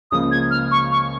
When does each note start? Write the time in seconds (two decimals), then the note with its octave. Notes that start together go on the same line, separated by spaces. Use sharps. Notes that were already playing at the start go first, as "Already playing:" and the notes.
0.11 C#2 C#3 F3 A#3 D#6
0.31 G#6
0.51 F6
0.71 C#6
0.92 C#6